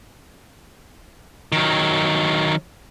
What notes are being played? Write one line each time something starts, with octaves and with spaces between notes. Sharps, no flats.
D#3 F#3